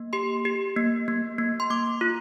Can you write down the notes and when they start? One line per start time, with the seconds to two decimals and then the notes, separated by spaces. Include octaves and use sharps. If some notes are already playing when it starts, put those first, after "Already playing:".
Already playing: A#3
0.13 G4 C6
0.45 G4
0.77 A#3
1.08 A#3
1.38 A#3
1.60 C6
1.70 A#3 D6
2.01 F4